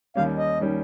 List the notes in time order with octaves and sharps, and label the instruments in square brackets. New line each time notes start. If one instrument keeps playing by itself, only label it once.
[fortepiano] D#2 D#3 G3 C#4 [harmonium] F5
[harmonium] D#5
[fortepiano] D#3 G3 C#4